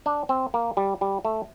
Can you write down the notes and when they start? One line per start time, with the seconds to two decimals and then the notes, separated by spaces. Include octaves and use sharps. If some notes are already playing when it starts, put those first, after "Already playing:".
0.06 D4
0.29 C4
0.54 A#3
0.77 G3
1.01 G3
1.25 A3